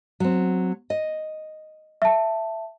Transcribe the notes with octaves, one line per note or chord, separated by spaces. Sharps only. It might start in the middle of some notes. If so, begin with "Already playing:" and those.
F#3 C4
D#5
E5 A5